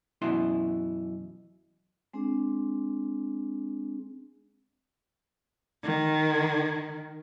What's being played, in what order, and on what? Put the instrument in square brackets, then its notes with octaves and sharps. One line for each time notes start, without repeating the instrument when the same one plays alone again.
[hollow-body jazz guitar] F#2 B2 E3 E4 C6
[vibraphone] G#3 C4 D4 G#4
[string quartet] D#3